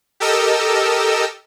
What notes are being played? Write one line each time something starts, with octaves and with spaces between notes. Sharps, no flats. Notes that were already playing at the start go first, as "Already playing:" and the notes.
G4 A4 A#4 D#5 E6